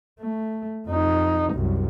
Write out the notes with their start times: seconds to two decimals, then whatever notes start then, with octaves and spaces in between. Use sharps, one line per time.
0.20 A3
0.87 F2 D#4
1.53 C2 F#2